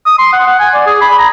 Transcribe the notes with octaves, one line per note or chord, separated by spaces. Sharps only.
D#6
C6
F#5
F#5
G#5
D5
G#4
B5
A#5